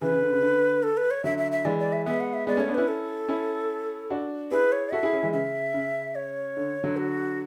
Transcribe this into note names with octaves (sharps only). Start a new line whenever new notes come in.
C#3 E3 B4
C#3
D3
C#3
D3
A4
B4
C#5
D3 F#3 E5
E5
E5
E3 G#3 D5
D5
E5
G#3 B3 E5
F#5
E5
G#3 B3 D5
A3 C#4 C#5
B3 D4
C#4 E4 B4
A4
C#4 E4
D4 F#4
E4 G#4 B4
C#5
F#4 A4 E5
E4 G#4
C#4 E4
E3 G#3
C#3 E5
C#3
C#5
D3
D3 F#3
F#4